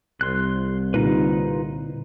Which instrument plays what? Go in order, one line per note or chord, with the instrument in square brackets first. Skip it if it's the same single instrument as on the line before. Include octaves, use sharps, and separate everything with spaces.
[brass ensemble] C2 [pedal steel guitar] C6 F#6
[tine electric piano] A#2 D3 [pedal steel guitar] D#4 F4 B4